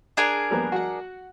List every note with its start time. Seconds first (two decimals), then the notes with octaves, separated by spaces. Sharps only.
0.17 D4 G#4 A#4
0.51 G3 A#3 B3
0.72 F#4 F#5